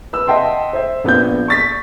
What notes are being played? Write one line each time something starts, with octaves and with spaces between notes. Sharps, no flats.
B4 E6
D#5 E5 F#5 G5 A5 C6
C5 E5
A#1 B3 F4 G6
C#6 A6 B6